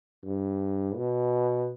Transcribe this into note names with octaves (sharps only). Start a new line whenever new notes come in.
G2
B2